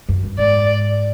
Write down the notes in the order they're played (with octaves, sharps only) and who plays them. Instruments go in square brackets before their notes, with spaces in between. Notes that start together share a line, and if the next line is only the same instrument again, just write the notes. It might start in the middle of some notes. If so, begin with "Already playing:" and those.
[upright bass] F#2
G2
[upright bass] G#2 [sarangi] D5